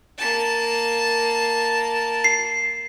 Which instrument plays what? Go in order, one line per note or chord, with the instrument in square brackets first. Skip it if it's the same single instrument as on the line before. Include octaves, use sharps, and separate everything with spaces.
[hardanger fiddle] A#3 A5
[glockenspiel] C7